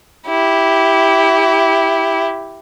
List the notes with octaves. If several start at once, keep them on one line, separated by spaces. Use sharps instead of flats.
E4 G4